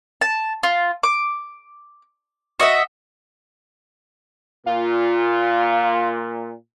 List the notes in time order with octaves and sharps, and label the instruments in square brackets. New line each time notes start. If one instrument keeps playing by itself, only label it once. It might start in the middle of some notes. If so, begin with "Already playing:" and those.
[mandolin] A5
F4
D6
F#4 D#5 E5
[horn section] A#2 [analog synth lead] F4